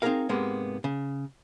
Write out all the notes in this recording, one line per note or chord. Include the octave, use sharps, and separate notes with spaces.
C4 D#4 E4 G#4 A#4 F5
G#2 C3 G#3 A#3 B3
C#3